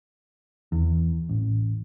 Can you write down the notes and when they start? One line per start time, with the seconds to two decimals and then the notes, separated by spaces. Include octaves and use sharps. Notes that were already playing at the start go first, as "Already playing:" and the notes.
0.72 E2
1.29 A1